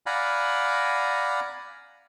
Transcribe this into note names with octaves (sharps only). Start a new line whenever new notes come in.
D5 F5 F#5 G#5 A#5 B5